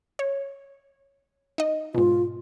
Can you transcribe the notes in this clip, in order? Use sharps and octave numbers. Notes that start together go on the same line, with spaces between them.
C#5
D#4 D#5
G#2 B2 F4